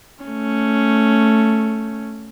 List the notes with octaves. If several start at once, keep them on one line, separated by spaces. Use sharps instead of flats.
A3 C#4